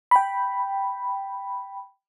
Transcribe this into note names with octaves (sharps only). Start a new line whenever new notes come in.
G5 B5